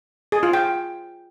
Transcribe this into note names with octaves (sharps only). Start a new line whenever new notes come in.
G#4
F4
G5